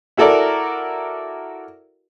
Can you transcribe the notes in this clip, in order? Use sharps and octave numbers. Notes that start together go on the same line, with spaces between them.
E4 F#4 A4 A#4 D5